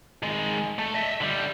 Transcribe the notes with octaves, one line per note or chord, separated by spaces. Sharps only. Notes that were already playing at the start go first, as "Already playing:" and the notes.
D#3 G#3
A3
D#5 E5
D3 G3